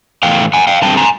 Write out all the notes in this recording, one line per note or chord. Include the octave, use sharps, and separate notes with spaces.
A2 E3 A3 F5 G5
F#5 G#5
F5 G5
D3 G3 C4 G5 A5
G#5 A#5